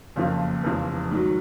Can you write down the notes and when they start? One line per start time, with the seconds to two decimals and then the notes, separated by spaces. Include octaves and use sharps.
0.16 F#1 F2 C#3 F3 A#3
0.63 F1 E2 C#3 F3
1.11 G#2 D#3 F#3